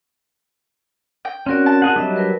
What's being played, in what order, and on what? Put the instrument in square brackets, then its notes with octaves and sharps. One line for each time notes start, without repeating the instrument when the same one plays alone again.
[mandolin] G5
[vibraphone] C4 A#4 D5 [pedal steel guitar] C#4 F#4
[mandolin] A5
[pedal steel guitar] F#4 G#4 F#5
[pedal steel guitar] F#3 G3 [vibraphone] D4 D#5 E5
[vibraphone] A#4 B4